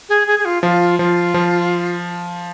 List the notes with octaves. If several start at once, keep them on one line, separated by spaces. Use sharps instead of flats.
G#4
G#4
G#4
F4
F3 F4
F3 F4
F3